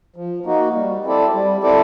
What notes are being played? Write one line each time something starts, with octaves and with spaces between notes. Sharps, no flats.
F3
A#3 D#4 F#4
G3
C4 E4 A4 D5
G3
C4 E4 A4 D5